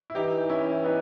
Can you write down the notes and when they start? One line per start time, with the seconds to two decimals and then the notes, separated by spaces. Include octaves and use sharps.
0.10 E4
0.15 E3 D#4 G4
0.50 C#4 E4
0.84 B3 D#4